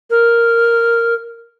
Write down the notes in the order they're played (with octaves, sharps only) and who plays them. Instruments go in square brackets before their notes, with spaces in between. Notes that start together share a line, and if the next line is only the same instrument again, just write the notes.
[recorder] A#4